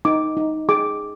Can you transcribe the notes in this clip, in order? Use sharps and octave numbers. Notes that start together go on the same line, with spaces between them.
D#4 D6
D#4
G#4 D6